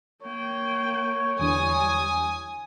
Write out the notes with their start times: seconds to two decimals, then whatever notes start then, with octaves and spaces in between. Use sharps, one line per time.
0.22 A#3 C#5 G5
1.39 E2 D3 E3 G3 G#5 D#6